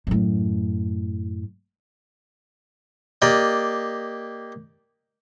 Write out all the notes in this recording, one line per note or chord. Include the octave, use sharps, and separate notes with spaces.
F#2 A2
A#3 G4 D5 D#5